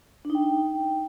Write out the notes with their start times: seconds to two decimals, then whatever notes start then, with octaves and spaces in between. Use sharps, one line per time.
0.25 D4
0.30 D#4
0.35 G5